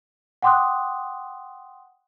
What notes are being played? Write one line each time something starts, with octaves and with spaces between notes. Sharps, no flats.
F#5 G5 C6 D6 D#6 F#6